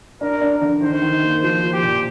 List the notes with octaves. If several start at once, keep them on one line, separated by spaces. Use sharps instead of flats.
D4 A#4
D4
D3
D#3 C5
D#3
A#3
F3 C5
F3
G4
A#2